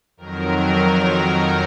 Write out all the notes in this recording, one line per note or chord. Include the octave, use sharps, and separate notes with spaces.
F2 D#3 F#3 A#4